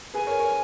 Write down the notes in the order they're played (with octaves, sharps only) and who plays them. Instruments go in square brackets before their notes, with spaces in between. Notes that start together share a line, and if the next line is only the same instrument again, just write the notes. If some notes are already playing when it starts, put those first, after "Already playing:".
[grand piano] G#4 B4 [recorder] G#5
[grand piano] A#4 C#5
A#4 C#5